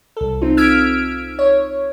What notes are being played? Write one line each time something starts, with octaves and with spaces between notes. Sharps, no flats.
C2 A4
C4 D#4 F4
E6 F6 G#6 B6 D7
C#5